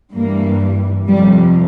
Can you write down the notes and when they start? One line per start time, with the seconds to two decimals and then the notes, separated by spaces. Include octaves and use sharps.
0.14 G2 E3 G3 A#3
1.08 F2 C3 F3 G3